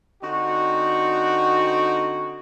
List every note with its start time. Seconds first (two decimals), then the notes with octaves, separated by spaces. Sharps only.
0.22 D3 C4 D#4 F#4